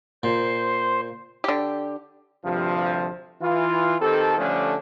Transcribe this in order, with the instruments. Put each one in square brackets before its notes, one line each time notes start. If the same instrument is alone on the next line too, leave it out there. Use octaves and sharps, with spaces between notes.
[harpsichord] A#2 [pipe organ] C5 C6
[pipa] D3 G4
[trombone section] D2 G2 C3 F3
E3 F4
D#3 C4 G4 A4
D3 F3 G3 A3 C#4 D4